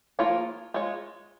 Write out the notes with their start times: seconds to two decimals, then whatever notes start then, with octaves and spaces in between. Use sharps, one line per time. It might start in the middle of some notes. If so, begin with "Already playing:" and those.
0.19 F3 A#3 F4 G#4 C#5
0.74 G#3 F4 C#5